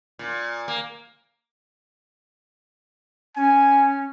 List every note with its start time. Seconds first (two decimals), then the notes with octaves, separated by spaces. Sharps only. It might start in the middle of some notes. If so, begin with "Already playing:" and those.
0.19 A#2
0.68 A#3
3.36 C#4 G#5